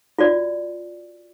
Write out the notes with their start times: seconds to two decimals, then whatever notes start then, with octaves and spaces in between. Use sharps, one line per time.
0.19 F4 F#4 D5